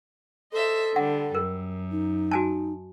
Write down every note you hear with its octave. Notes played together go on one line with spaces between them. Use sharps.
A4 C5 D#5 E5
D3 G3 F#5
F#2 A#4
D#4
F#4 G#5 A5